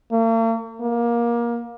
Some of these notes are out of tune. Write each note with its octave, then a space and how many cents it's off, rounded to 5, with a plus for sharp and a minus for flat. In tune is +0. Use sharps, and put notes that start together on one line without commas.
A#3 -45
A#3 +20